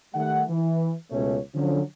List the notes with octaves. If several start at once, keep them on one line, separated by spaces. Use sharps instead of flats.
D#3 G3 A3 F#5
E3
C#2 B2 A3 C#4 C#5
D3 F3 F#3 C#4